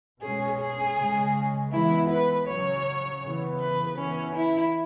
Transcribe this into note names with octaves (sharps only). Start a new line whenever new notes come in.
B2 G#3 C#4 G#4
G#4
C#3 G#3 C#4
E3 G#3 B3 E4
B4
C#3 F#3 C#4 C#5
C#3 E3 B3
B4
E3 B3 C#4
E4